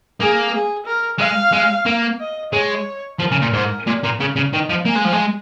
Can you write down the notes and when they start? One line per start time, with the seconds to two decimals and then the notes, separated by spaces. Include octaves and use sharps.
0.20 A#3 G#4
0.53 G#4
0.86 A#4
1.19 G#3 F5
1.52 G#3
1.86 A#3
2.20 D#5
2.53 G#3 C#5
3.19 F3 A#4
3.31 C#3
3.42 A#2
3.53 G#2
3.87 A#2
4.03 A#2
4.20 C#3 A#4
4.36 C#3
4.53 D#3 D#5
4.70 F3
4.86 A#3 G#5
4.96 G#3
5.05 F3
5.13 G#3